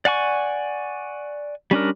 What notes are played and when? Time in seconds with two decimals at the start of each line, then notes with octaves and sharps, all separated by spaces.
0.05 D5 F#5 G#5 C#6
1.71 G3 C#4 D4 A#4